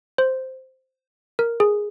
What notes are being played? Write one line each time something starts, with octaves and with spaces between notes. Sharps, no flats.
C5
A#4
G#4